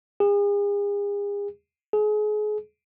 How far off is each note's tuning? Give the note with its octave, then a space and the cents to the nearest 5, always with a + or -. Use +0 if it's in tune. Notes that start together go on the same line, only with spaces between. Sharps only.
G#4 -40
G#4 +30